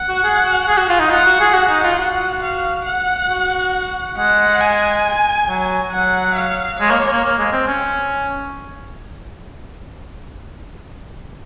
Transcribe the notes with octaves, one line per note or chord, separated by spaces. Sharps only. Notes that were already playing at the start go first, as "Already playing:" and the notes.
Already playing: F#5
F#4
G#4
F#4
G#4
F#4
F4
D#4
F4 F#5
F#4
G#4
F#4 F#5
D#4
F4
F#4 F#5
F5
F#5
F#4
G#3 F#5
G#5
F#3
F#3 F#5
F5
G#3 C#5
A#3
A#3
A#3
G#3
C4
C#4